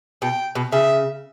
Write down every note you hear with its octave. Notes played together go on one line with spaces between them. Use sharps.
B2 G5
B2
C#3 E5